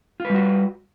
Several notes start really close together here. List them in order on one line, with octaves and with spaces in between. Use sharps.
F4 B4 G3 F#4